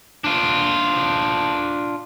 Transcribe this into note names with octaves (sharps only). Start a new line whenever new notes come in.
D4 F4